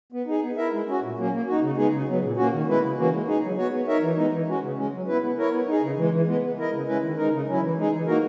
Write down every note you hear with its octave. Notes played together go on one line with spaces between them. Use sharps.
B3
D#4 G#4
B3
E4 A#4 E5
G#3
C#4 F#4
A#2
F#3 A#3 C#4
A#3
D#4 F#4
C#3
G#3 B3 D#4 G#4
C#3
F#3 B3
A#2
A#3 C#4 F#4
D#3
G#3 B3 E4 B4
C#3
E3 A#3 C#4 F#4
G#3
D#4 G#4
F#3
B3 F#4 C#5
B3
D#4 A#4 C#5 E5
E3
G#3 B3 D#4
E3
G#3 C#4 F#4
C#3
G#3 C#4
F#3
B3 E4 B4
B3
E4 A#4 C#5
B3
D#4
G#4
C#3
E3 G#3
E3
G#3 B3
B3
E4 A#4 D#5
C#3
G#3 C#4 E4 B4
D#3
G#3 D#4 A#4
C#3
F#3 C#4 E4
E3
G#3 D#4 G#4
E3
A#3 D#4 F#4 A#4